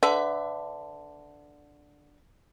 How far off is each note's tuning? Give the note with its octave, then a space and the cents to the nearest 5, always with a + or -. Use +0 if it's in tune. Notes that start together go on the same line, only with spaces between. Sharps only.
D3 +0 B4 +25 E5 +10